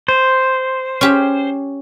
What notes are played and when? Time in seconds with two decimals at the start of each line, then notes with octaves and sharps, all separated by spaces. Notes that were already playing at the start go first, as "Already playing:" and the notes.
0.08 C5
1.01 C#4 G4